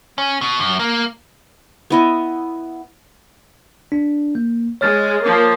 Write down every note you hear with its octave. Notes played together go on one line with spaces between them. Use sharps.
C#4
B2
F#2
A#3
B3 E4 D#5
D4
A#3
G#3 C#5 F6 A6
F3 A#3